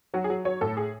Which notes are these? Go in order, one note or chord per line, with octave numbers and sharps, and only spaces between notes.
F#3 F#4
G#4
F#3
F#3 C#5
A2 A4
G#4